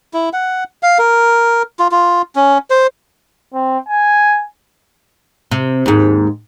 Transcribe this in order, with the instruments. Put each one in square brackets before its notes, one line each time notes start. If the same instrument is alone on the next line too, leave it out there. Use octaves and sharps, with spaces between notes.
[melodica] E4
F#5
F5
A#4
F4
F4
C#4
C5
[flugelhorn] C4
G#5
[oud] C3
D#2 G#2